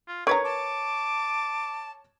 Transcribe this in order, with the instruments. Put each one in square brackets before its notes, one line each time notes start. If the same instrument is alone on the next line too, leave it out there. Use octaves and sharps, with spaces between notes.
[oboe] F4
[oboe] G#4 [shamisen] A#4 B4 A#5 [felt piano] C#5 C#6 G#6
[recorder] A5 [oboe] D6